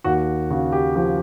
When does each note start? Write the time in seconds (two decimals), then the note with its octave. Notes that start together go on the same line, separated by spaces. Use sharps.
0.04 D#2 F#4
0.50 C#3 F#4
0.73 G4
0.96 F3 G4